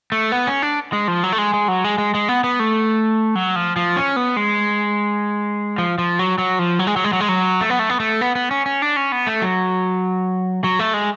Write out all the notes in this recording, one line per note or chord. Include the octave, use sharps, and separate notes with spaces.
A3
B3
C#4
D4
G#3
F3
F#3
A3
G#3
G#3
F#3
G#3
G#3
G#3
B3
B3
A3
F#3
F3
F3
C#4
B3
G#3
F3
F3
F#3
F#3
F3
F#3
G#3
F#3
G#3
F#3
G#3
F#3
A3
B3
A3
B3
A3
B3
B3
C#4
C#4
D4
C#4
B3
A3
F#3
F#3
A3
G#3